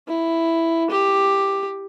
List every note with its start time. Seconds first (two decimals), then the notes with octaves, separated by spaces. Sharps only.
0.08 E4
0.90 G4